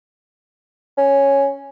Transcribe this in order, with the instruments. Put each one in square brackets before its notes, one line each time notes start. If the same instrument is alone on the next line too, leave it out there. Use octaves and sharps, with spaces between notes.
[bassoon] C#4